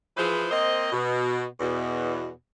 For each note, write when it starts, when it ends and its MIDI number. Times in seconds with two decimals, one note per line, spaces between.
0.17 0.47 52
0.17 0.47 53
0.17 0.47 64
0.17 0.47 68
0.17 0.47 71
0.17 0.47 72
0.51 0.91 58
0.51 0.91 60
0.51 0.91 72
0.51 0.91 75
0.92 1.44 47
1.60 2.30 40
1.60 2.30 47